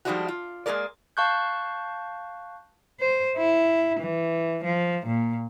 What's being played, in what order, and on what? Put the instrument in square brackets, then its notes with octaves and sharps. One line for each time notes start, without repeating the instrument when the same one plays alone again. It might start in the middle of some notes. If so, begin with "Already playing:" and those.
[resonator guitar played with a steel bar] F3 G3 G#3 D4 D#4 F#4
F4
G#3 A#3 G#4 A#4 D5
[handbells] F5 A5 C#6 F#6 G6
[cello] C5
E4
E3
F3
A#2